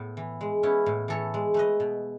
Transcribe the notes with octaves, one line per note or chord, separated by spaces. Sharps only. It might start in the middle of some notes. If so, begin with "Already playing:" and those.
Already playing: A2 B3
E3
G#3
B3 C#4 E4
A2
E3 A4 C#5
G#3
A3 B4 D#5
B2